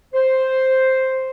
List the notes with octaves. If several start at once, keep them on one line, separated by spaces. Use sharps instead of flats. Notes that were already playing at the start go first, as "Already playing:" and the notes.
C5